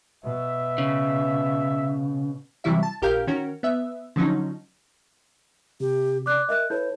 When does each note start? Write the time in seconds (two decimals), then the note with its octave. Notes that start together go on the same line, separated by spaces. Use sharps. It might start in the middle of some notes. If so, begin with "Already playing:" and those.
0.25 B2 E5
0.78 C#3
2.64 C3 E3 F#3 G3 E4 E5
2.83 A5
3.02 A#1 G4 A#4 F5 G6
3.27 D#3 C#4 F#4 A#4
3.63 B3 E5
4.16 D3 F3 F#3 C#4 D#4
5.80 C3 G4
6.26 D5 D6 F#6
6.49 A#4 D#5 E5 F#6
6.70 E4 A4 B4 C#5 G6